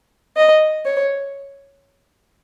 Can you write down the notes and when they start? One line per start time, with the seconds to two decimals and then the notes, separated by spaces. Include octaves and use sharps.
0.37 D#5
0.85 C#5